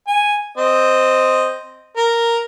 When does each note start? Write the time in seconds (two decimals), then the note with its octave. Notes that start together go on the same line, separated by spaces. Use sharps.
0.08 G#5
0.58 C4 D#5
1.97 A#4